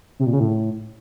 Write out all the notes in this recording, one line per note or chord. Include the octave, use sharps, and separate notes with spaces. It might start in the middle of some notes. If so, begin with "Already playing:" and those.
C3
A#2
C#3
A2